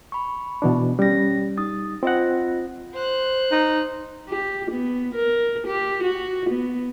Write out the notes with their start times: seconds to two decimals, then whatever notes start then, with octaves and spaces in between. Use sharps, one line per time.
0.12 B5 C#6
0.62 B2 E3 D4
0.99 G3 C#4 A#6
1.57 D#4 D#6 A6
2.03 C4 F4 D#5 F#5 A#6
2.94 C5 F#6
3.52 D#4
4.29 G4
4.71 B3
5.14 A#4
5.67 G4
6.03 F#4
6.49 B3